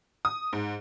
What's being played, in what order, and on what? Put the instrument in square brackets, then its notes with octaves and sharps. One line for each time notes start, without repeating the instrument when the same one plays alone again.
[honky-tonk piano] D#6
G#2